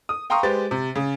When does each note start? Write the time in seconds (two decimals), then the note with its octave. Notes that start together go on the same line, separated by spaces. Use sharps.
0.09 D#6
0.30 F5 G5 A#5 C6 C#6 D#6
0.43 G#3 G4 B4 C5 A6
0.71 C3
0.95 C#3